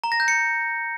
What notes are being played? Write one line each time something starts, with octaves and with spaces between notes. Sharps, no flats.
A#5
A#6
G6
C#7